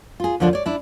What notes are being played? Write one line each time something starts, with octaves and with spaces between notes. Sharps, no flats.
F4 G#4
D#2 D3 F3 A#3 D4
C#5 D5
D4 E4